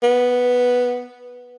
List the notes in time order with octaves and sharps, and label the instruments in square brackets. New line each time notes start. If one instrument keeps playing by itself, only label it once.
[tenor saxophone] B3